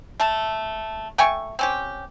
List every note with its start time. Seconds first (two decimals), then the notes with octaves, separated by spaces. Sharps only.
0.20 A3 A5
1.18 A3 G5 G#5 C#6
1.59 C4 C#4 G4